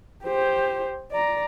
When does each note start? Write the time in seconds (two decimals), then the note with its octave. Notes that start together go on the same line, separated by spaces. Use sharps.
0.24 G4 C5
1.12 D5 A#5